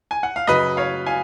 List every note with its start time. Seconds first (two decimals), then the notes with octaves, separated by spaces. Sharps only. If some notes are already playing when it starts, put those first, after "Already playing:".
0.11 G#5
0.23 F#5
0.36 F5
0.47 F#2 C#3 F#3 B4 D#5
0.77 C#5 F5
1.06 F5 G#5